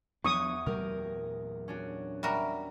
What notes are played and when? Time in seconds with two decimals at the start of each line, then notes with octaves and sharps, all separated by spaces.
0.25 E2 F3 B3 D4 F#5 C#6 D#6
0.66 A#2 F#3 A3 G4 A#4
1.68 C#4 D4 F#4
2.23 G3 F#4 A#4 E5